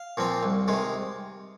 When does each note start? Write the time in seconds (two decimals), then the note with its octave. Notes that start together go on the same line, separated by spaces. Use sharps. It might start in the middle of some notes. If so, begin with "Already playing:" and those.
Already playing: F5
0.17 A#2 F3 C4
0.43 C2
0.68 C3 D#3 G#3